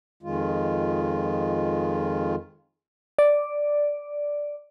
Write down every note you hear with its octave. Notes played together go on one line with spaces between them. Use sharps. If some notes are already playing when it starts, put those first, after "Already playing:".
F2 D#3 G#3 F4
D5